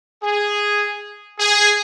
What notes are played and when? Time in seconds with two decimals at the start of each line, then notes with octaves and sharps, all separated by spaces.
0.23 G#4
1.39 G#4